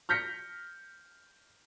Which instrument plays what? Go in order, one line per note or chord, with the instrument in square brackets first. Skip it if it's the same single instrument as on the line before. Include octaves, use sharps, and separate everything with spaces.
[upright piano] F6 G6 A#6 B6 C#7